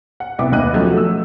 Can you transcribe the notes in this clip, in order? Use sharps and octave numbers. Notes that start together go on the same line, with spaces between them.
F#5
C2 B3 E5 D6
D#2 B3 D#5 F#6 D#7
F3 F#3 A3 C#4
A3 E6